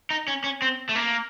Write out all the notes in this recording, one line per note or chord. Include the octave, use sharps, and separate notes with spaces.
D#4
C#4
C#4
C4
A3
A#3